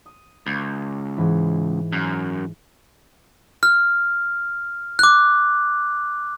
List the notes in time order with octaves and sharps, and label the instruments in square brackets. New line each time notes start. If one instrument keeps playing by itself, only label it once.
[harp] D#6
[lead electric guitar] C#2 [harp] B5 D#6 G#6
[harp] G#2 E3 B5
[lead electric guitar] F#2
[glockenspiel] F6
D6 F#6